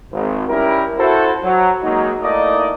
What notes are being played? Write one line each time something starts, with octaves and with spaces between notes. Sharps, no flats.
G#1
G3 C#4 E4 A#4
E4 F#4 A4 C5
F#3
F#3 G#3 A#3 D#4
A3 A#3 D#4 E4 D5 D#5